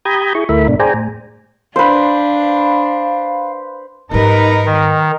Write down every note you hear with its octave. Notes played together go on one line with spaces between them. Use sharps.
G4 A#5 B5 D#6 G6 G#6
E4 G#4 C#6
D2 A3 E4 A#4 E5 B5
G#2 B2 D4
G#4 C5 D5 G5 G#5 A#5
A2
D4 B4 C5 F5
G#2 G3 D#4 A#4 B4
D#3